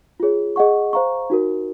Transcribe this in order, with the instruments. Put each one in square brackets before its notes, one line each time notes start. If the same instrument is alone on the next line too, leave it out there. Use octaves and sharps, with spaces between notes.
[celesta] F4 G#4 C#5
G#4 D#5 F#5 C#6
C5 F5 A#5 C#6
D#4 F#4 A#4